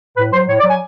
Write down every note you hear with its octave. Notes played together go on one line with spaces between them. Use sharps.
A2 B4
F#3 C5
A2 C#5
D5
F#3 G#5